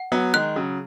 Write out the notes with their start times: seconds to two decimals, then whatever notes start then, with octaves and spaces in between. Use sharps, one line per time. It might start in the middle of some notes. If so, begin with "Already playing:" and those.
Already playing: F#5
0.12 F#3 B3
0.34 D#3 G#3 F#6
0.56 C#3 F#3